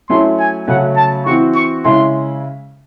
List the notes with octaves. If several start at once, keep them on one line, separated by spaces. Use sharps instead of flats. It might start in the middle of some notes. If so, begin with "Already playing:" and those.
F#3 A3 C#4 E4 C6
G#5
C#3 F#3 A3 C#4 F#5
A5
E3 C4 F#4 C#6
C#6
C#3 G#3 C#4 E4 C6